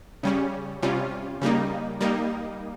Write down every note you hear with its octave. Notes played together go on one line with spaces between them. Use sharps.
C#3 G3 C#4
C3 G3 C#4 F4
C#3 G3 A#3 D#4
G3 A#3 D#4